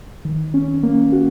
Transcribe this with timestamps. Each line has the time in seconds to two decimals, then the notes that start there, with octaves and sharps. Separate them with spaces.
0.25 D#3
0.54 C#4
0.83 A#3
1.12 F#4